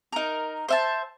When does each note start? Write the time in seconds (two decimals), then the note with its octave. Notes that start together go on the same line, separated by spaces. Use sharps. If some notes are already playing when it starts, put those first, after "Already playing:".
0.12 D#4 A#4
0.69 C5 E5 A5